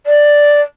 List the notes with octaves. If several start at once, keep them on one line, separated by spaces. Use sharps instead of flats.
D5